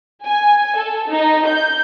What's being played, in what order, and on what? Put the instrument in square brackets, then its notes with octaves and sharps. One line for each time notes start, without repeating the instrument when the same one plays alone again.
[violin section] G#5
A4
D#4
G6